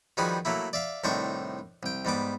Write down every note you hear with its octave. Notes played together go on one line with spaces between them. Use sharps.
D#3 F3 G3 F#4 G#4 B4
F#3 A3 A#3 E4
D5 E5 F5
C2 A2 D#3 D4 C5 C#6
C2 G5
G#2 G3 B3 D6